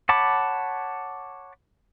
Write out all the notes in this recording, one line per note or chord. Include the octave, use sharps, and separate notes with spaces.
C#5 F#5 A5 B5 D6